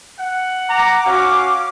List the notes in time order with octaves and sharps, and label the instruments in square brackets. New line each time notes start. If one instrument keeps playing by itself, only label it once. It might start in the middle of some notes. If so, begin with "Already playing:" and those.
[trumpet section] F#5
[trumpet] A#5 [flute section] D6
[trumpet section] C#4 F5 [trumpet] F#4